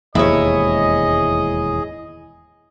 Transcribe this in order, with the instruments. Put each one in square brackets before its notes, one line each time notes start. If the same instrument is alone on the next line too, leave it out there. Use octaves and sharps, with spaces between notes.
[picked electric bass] E1 D#2 G#2 [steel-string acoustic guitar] E4 C#5 [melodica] G#4 [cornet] D#5